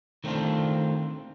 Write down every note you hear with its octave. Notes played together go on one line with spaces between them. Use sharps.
D#3 A3 B3 C4 D4 F4